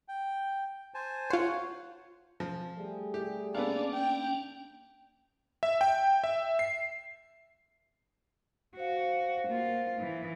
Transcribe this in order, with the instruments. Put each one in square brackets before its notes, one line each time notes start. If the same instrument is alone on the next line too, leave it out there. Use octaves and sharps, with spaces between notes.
[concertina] G5
C5 G#5 A5
[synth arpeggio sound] F4 C5 [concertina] C#5 F#5
[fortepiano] F3
[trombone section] G3 A3 G#4
[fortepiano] G4
[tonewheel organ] A#3 C#4 D4 [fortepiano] B3 A4 F5 [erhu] D5
[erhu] G5
[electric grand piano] E5
G5
E5
C7
[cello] F#4 [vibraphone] C5 F5
[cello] A#3 F4
E3